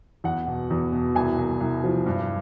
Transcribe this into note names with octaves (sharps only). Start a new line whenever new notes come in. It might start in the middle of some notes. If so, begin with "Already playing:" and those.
E2 F#5
B2
E2
B2
C2 G#5
C2
C2
F3
G2